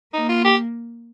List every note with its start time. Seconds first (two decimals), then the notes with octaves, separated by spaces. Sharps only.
0.14 A#3 D#4
0.29 F4
0.45 G4